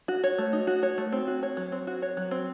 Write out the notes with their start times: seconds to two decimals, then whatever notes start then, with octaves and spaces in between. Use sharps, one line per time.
0.08 F#4
0.24 C#5
0.38 A3
0.53 D#4
0.67 F#4
0.83 C#5
0.98 A3
1.12 C4
1.27 F#4
1.43 C#5
1.57 F#3
1.72 C4
1.87 F#4
2.02 C#5
2.17 F#3
2.31 C4